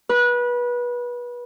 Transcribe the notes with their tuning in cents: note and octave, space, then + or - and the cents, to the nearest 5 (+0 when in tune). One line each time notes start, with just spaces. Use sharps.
B4 -25